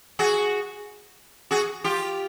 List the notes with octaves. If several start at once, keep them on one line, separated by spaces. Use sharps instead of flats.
F#4 G#4
F#4 G#4
F4 G4